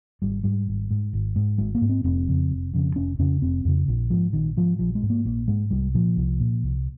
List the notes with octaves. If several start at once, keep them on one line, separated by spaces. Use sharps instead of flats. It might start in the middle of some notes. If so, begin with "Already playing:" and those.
G#1 G3
G#2 G3
G#1
G#2
G#1
G#2
G#1 G#3
A#3
G#2
C4
F1 C4
F2 C#3
F1
F2 C#3
F1 C#4
F2 C#3 C#4
F1 C4
F2 C#3
A#1
G#2 F3
A#1 D#3
G#2 F3
A#1 F3
G#3
G#2
A#3
A#1 A#3
G#2 G#3
C2 G3
A#2 F3
C2
A#2
C2